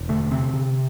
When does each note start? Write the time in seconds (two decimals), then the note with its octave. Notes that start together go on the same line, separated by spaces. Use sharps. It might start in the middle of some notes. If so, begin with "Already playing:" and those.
Already playing: E1
0.09 D3 A3
0.31 C3 C4
0.54 C3